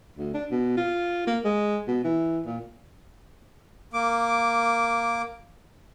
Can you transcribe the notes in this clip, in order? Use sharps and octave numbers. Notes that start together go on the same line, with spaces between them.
D2
D4
B2
F4
A#3
G#3
B2
E3
A#2
A#3 D6